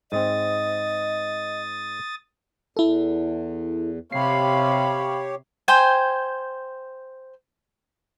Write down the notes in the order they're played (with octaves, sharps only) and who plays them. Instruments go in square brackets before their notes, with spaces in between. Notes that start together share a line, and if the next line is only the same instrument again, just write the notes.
[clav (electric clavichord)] G#2 G#3 C4 [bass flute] D#5 [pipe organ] D#6 A6
[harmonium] E2 [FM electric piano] E4 A4
[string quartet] C3 [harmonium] G4 C#5 [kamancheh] F5 B5 [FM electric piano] C7
[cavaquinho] C5 G5 G#5